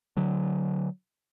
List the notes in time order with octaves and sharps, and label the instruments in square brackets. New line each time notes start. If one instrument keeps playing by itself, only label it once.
[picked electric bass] D3 F#3